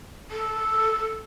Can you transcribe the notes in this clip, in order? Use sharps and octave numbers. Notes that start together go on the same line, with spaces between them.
A4